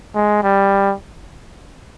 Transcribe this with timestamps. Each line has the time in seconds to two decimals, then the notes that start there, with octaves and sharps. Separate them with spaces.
0.15 G#3
0.43 G3